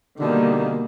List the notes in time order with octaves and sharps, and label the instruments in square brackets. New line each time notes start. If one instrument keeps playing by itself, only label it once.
[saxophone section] B2 D3 [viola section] D#3 G3 A#3